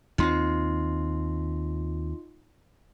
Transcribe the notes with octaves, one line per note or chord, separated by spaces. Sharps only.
D#2 A3 C4 D#4 F4 C6